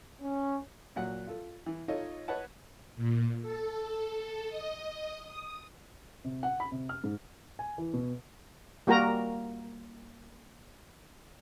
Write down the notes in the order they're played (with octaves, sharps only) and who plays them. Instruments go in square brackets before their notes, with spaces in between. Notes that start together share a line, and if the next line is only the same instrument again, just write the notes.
[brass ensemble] C#4
[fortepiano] A#2 F#3 F#5
F4 A4
E3
D#4 F4 A4 C#5 D#5
B4 C#5 D#5 F#5 A5
[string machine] A#2
A4
D#5
D#6
[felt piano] C3
F#5
B5
C3
F6
G#2
[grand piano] G#5
E3
B2
[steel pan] G3 A#3 F#4 A#4 A#5